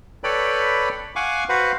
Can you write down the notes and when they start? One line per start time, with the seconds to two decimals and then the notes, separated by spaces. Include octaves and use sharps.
0.24 A4 B4 C#5 D5 G5 B5
1.16 F5 F#5 G#5 C#6 D6
1.49 F#4 B4 C5 F5 F#5